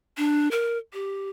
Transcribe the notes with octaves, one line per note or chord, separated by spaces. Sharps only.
D4
A#4
G4